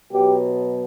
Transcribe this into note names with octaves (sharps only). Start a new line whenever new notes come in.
B2 F#3 G4